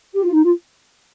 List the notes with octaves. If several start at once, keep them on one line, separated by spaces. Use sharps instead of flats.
G4
F4
D#4
F4